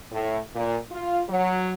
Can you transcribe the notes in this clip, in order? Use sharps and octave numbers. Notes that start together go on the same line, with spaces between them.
A2
A#2
F4
F#3